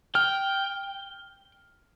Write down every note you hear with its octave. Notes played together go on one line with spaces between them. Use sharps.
G5 F6